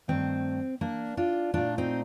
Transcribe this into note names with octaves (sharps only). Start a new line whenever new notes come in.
G2 D#3 A3 C4
A#3 D4
D4 F4
A#2 A3 D4 F4
C4 D#4